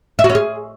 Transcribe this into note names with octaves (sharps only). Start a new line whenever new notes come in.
E5
F#4
C#4
G#4